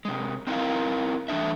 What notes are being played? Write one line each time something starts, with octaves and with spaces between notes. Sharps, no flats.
C3 G#3
C4 D#4 E4 A#4 F5
E3 A3 D4 E5